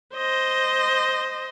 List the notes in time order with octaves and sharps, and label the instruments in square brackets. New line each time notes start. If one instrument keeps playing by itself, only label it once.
[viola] C5 D#5